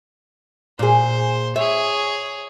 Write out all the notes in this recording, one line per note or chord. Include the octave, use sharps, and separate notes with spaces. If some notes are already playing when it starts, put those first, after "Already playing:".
A#2 G#4 C5
G#4 C#5 E5